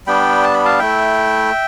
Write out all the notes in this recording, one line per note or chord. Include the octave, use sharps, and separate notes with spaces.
G3 B3 D4 G5 B5
A5
B5
F5 A5
A3 E4 E5 G5